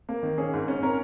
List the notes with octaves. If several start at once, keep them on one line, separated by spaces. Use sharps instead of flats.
A#3
D#3
C#4 G#4
G#2
C#4
C#4 A#4